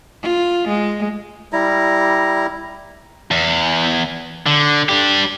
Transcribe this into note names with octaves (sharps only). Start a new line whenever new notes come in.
F4
G#3
G3 E4 A#5
E2
D3
D4 G4